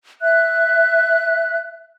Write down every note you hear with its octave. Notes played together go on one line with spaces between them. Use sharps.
E5 F#6